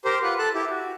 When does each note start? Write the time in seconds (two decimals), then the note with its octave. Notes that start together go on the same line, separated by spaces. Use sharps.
0.05 G4 A#4 C5
0.23 F4 B4 F#5
0.39 A4 A5 F#6
0.54 E4 G4
0.70 F#4